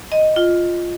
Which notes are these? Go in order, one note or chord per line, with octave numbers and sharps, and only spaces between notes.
D#5
F4